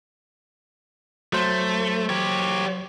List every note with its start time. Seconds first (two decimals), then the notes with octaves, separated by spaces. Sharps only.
1.33 F#3 A3 C5
2.09 G4 C#5